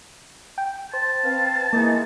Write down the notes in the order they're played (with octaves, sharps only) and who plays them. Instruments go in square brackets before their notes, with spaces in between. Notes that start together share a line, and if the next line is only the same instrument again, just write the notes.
[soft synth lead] G5
[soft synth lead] C5 [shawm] A5
[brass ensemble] C4 B4 F5
[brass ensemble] E3 G#3 D#4 [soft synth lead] A#3